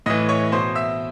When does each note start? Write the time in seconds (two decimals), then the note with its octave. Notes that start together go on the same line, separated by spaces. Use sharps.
0.06 A2 E3 D#5 D#6
0.29 C#5 C#6
0.52 B2 C5 C6
0.75 E5 E6